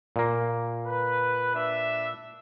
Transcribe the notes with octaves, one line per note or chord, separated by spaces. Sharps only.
A#2 A#3
B4
D4 E5